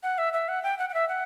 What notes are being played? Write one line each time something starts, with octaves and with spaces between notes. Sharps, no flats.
F#5
E5
E5
F#5
G5
F#5
F#5
E5
F#5